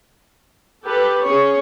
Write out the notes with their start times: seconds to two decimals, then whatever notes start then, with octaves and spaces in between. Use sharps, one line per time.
0.84 G4 A4 B4
1.24 C#4 G#4 C#5